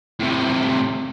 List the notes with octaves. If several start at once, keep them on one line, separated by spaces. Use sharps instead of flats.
A2 C3